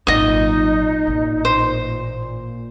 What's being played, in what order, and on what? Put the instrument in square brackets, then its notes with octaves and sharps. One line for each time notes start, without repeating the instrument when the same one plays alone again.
[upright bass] G#1 F#3 [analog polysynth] A#2 [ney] D#4 [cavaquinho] D#5 D#6
[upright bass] A1
[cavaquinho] C5